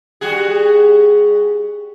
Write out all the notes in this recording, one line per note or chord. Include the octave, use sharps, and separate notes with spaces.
G3 F#4 G#4